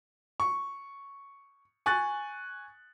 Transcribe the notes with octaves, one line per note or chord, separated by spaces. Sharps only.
C#6
G#5 C#6 F#6 A6